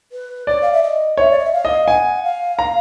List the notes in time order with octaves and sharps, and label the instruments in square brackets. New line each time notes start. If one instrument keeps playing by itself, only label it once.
[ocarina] B4
[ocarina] C#5 [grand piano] D5
[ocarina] F5
E5
D#5
[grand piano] C#5 [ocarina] E5
[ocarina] D5
D#5
E5
F5
[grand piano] D#5
[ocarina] F#5 [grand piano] G#5
[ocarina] F5
[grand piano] A#5